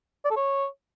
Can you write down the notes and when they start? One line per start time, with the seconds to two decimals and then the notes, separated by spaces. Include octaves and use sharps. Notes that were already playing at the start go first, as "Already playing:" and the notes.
0.25 D5
0.31 A4
0.36 C#5